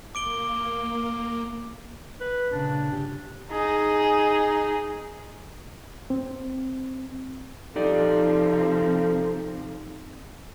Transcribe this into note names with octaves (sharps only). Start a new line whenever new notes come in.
A#3 D6 D7 G7
B4
A#2 C#3 D4
G2 C#3 G4
D#4 G#4
C4
C3 F3 C4 D#4 G4 A4 D5